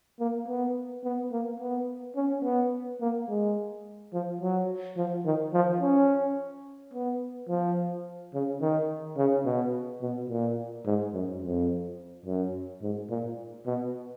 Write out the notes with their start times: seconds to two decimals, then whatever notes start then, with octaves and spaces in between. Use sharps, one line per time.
0.20 A#3
0.48 B3
1.04 B3
1.32 A#3
1.60 B3
2.16 C#4
2.44 B3
3.01 A#3
3.28 G#3
4.13 F3
4.41 F#3
4.97 F3
5.25 D#3
5.53 F3
5.80 C#4
6.94 B3
7.49 F3
8.34 C#3
8.61 D#3
9.17 C#3
9.45 B2
10.02 B2
10.30 A#2
10.86 G#2
11.14 F#2
11.42 F2
12.26 F#2
12.82 G#2
13.10 A#2
13.66 B2